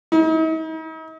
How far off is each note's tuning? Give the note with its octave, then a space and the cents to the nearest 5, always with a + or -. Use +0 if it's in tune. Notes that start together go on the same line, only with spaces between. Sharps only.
D#4 +45